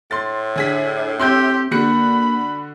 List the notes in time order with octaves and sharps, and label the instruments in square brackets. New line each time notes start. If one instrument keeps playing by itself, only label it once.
[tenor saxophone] A2 [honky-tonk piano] C6 A6
[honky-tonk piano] D3 G#4 B6
[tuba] C4 [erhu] G4 [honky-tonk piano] C6 E6 G6
[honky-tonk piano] D3 F#4 C#7 [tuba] A#3 [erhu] B5